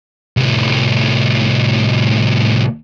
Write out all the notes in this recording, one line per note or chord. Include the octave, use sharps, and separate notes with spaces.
C2 A2